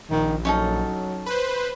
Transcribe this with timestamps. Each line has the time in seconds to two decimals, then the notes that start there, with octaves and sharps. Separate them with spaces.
0.11 A#1 D#3
0.45 F#3 C#4 D#4 A4
1.26 B4 C5